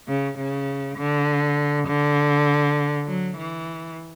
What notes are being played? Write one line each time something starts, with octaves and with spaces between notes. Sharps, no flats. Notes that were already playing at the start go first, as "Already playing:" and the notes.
C#3
C#3
D3
D3
F#3
E3